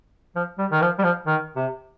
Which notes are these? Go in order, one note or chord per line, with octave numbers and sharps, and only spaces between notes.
F3
G3
D#3
F3
G3
F3
D#3
C3